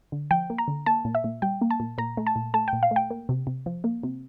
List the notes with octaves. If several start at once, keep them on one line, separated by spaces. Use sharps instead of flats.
D3
F3 G5
A#3
A#5
D3
A#3 A5
A#2
E5
A#2
G3 G5
A#3
A5
A#2
A#2 A#5
A3
A5
A#2
A3 A5
G5
A#2
F5
A3
G5
A#3
C3
C3
F3
A#3
C3